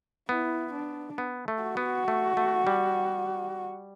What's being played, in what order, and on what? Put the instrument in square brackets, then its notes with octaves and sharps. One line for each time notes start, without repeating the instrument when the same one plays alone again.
[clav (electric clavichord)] B3 [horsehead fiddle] E4
[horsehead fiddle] D4
[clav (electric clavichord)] B3
A3
[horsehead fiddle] F#4
[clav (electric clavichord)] B3
A3
A3
G3